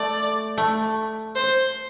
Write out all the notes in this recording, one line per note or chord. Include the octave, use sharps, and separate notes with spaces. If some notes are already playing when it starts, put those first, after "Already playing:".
Already playing: A3 D5
A3
C5